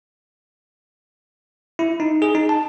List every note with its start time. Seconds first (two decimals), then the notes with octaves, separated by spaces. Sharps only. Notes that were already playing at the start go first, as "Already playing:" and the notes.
1.79 E4
2.00 D#4
2.22 G#4
2.35 D#4
2.49 A5